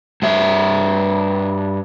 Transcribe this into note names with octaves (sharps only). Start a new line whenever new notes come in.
G2 E5